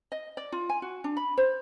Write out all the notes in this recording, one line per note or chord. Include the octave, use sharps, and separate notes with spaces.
D#5
D5
F4
G#5
F#4
D4
B5
C5